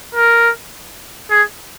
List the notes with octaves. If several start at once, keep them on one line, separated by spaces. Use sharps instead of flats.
A#4
G#4